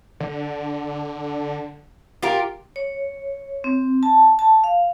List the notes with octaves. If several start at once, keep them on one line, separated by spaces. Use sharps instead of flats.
D3
F4 G4 A#4
C#5
C4
A5
A5
F5